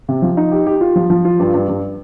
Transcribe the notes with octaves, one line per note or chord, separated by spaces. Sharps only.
C3
F3
D#4
G4
G4
F4
F3
F3
F4
G2
G2
G2